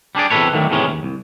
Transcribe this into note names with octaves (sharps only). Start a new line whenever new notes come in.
G3 D4 G#4 D5
E2 C3 A3 A4 B4 C#5
D3 D#3 F#3 G3 A3
E2 A2 C3 D#3 G#3 C#4
D#2
C2